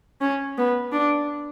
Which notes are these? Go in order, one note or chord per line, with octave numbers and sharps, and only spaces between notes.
C#4
B3
D4